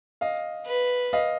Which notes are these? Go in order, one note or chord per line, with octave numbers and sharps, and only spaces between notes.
D#5 F5
B4
D#5 F5